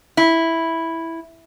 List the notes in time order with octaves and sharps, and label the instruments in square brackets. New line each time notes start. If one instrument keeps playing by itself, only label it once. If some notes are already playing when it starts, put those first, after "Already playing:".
[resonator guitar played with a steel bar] E4